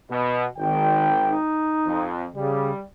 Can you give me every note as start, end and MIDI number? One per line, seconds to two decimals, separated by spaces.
0.10 0.46 47
0.58 1.35 32
0.58 1.15 51
0.58 1.35 79
1.28 2.06 63
1.87 2.26 41
2.36 2.71 49
2.36 2.81 55